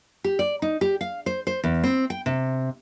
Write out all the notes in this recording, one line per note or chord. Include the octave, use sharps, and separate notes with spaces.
G4
D5
D#4
G4
F5
C5
C5
E2
C4
G5
C3